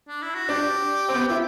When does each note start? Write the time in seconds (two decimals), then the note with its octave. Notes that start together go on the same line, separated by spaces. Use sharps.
0.08 D4
0.22 E4
0.35 F#4
0.49 D4 G4
1.08 C4
1.14 B3
1.28 E4 G4